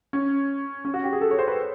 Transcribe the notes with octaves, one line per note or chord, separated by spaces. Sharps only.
C#4
C#4
F#4
G4
G#4
A4
C#5
C5
B4